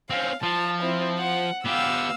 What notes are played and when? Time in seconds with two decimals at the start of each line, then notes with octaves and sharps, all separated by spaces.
0.10 C4 C#4 F5
0.43 F3 A5
0.82 C4 E4
1.19 F#5
1.65 B3 G4 F5 E6